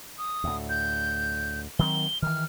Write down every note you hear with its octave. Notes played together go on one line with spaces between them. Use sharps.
D#6
D2 A2
G6
D#3 F#3 C4 G7
D#3 E3 F6